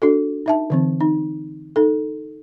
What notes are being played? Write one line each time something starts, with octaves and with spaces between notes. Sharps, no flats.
D4 F#4 A4
D#4 E5 A5
D3 E3 C4
D#4
D#4 A4